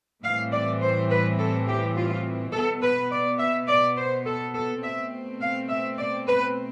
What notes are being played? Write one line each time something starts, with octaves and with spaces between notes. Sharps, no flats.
A2 E3 G3 C4 F5
D5
C5
B4
A4
G4
F4
B2 B3 A4
B4
D5
E5
D5
C5
A4
A4
B2 A3 C4 E5
F5
E5
D5
B4